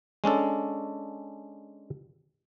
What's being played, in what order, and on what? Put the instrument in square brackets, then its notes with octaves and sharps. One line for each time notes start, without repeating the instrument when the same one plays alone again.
[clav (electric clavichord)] G#3 C#4 D4 A4